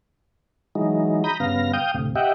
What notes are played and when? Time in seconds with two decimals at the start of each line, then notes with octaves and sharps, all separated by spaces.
0.75 E3 F#3 G#3 D#4
1.24 A#5 B5 D#6 G6
1.40 G2 C#3 B3 F5 A#6
1.73 F5 G5 D#6 G6
1.94 D2 A2 C3
2.15 G4 D#5 E5 F#5 G5